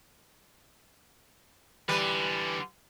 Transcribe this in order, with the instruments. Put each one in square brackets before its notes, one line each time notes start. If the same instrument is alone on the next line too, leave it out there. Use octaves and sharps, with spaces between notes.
[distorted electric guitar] D3 E3 [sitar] G3 B4